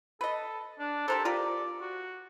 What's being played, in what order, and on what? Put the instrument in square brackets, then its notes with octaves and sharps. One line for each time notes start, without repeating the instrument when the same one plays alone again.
[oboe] A4 [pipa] B4 D#5
[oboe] D4
[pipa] G4 A#4 C5 [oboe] A4
[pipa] F4 G4 A#4 [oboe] D5
[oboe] F#4